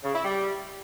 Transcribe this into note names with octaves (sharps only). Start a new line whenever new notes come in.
C#3
E4
G3